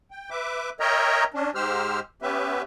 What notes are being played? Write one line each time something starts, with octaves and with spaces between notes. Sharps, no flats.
G5
B4 E5 D6
A#4 C#5 D#5 E5 G5 A#5
C#4 D4
G#2 G#3 G4 C5 E6 F6
B3 C#4 G4 B4 E5